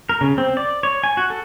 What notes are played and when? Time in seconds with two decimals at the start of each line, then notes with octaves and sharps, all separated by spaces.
0.09 A#4
0.21 C#3
0.38 C4
0.57 D5
0.83 C#5
1.04 G#5
1.17 F#4
1.30 A4